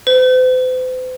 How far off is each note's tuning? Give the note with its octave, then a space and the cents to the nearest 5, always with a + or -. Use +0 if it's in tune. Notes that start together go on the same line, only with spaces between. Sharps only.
C5 -45